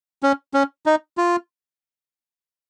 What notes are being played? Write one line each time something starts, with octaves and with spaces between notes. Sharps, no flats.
C#4
C#4
D#4
F4